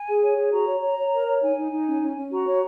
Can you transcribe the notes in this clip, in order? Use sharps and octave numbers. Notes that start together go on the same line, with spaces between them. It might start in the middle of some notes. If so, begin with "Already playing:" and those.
Already playing: G#5
G#4
C#5
G#4
F#4 A#5
C#5
C#5
C#5
A#4
C#5
D#4 G#5
D#4
D#4
C#4
C#4
C#4
F#4 A#5
C#5